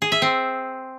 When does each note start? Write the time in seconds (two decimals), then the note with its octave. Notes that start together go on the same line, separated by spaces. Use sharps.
0.02 G#4
0.12 E5
0.22 C4